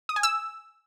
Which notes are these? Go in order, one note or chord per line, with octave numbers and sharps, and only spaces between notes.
D#6
G#5
E6